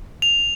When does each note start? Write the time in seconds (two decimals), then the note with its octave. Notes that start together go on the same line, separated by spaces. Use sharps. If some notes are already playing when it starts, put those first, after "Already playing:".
0.22 F7